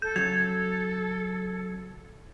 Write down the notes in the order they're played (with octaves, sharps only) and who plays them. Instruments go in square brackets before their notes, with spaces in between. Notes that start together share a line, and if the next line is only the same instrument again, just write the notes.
[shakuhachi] A4 [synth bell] G6
[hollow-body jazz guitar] C#3 F#3 [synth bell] G#6